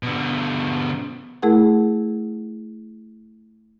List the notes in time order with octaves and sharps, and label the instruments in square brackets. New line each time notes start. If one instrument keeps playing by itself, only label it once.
[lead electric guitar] B2 D3
[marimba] A3 E4 G#4 A#4 F#5